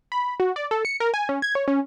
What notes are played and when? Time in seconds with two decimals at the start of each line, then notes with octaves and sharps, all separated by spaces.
0.12 B5
0.40 F#4
0.56 D5
0.71 A4
0.85 C#7
1.00 A#4
1.14 G#5
1.29 C#4
1.42 G#6
1.55 C#5
1.68 C#4